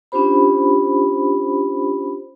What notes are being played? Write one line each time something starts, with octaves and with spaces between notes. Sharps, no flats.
C#4 D4 F4 G4 C5 B5